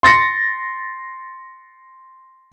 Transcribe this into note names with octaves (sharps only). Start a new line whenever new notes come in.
C6 A6 A#6 C#7